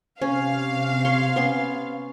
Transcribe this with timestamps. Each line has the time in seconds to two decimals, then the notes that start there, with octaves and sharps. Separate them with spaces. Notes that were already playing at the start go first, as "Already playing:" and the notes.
0.21 C3 C#4 F5
1.05 C#5 C6
1.36 B3 C#4 C6